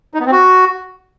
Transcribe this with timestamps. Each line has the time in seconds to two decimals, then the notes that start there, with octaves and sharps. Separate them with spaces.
0.14 D#4
0.20 B3
0.26 C4
0.32 F#4